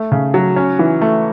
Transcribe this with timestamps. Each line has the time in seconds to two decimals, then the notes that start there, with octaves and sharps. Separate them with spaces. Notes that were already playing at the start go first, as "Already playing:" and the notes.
Already playing: A3
0.12 C#3
0.34 F#3
0.56 C#4
0.79 E3
1.01 A3